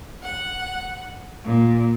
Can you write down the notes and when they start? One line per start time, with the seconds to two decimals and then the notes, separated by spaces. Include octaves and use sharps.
0.23 F#5
1.44 A#2